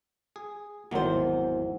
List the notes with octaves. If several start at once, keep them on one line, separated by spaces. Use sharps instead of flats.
G#4
G#1 E2 D#3 F#3 C5